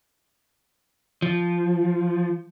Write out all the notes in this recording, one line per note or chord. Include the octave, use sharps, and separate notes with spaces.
F3